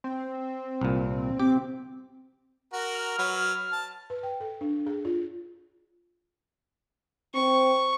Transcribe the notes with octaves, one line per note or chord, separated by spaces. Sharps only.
C4
C2 A#2
C4 G4 D6
F#4 A#4
F6
F#3 B4
A5
B4
G5
A4
D4
G#4
F4
C4 C#6